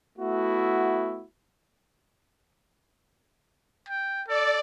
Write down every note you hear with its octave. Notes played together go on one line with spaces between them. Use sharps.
A3 B3 E4 F#4
G5
A4 D5